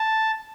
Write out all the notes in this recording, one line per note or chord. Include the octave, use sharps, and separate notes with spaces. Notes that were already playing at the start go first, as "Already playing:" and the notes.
Already playing: A5